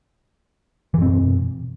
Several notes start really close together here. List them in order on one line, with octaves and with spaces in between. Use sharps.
E3 F#2 C4 B2